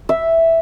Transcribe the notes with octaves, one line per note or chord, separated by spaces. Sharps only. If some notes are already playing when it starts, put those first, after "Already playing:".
E5